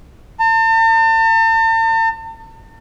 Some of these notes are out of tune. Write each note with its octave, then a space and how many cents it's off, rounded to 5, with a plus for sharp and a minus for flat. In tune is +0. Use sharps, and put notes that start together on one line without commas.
A5 +40